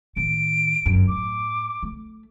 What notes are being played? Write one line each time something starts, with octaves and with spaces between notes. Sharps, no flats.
A2 D#3 D7
G1 F#2
A2 D6
A3